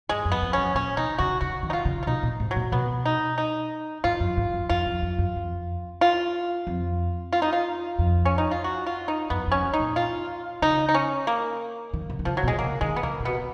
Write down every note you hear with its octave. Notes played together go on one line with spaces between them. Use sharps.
G#2 G#3
F#2
B3
F2
F#2 C#4
A#2 C#4
B2 D#4
C#3 F#4
C#3 F#4
D#3
D#4
F4
C#3
F4
B2 D#4
A#2
G#2
F#3
A#2
B2 B3
D#4
D#4
G#2 F4
F#2
G#2
F#2
F2 F4
F2
F2
F#2
F2
F4
F2
F4
D#4
F4
F2
C#4
D#4
F4
F#4
F4
D#4
F#2 B3
F2
C#4
F#2
D#4
A#2
F4
C#3 D#4
D#4
C#4
A#3
D#3
C#3
D#3
C#3 F3
F#3
B2
G#3
C#3 A#3
D#3 G#3
B3
C#3 A#3
A#2
B2 B3